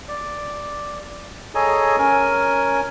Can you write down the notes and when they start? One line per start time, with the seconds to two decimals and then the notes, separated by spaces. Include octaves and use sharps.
0.08 D5
1.55 G#4 A4 C#5 D#5 G#5 A#5
1.98 C#4 A#4 G#5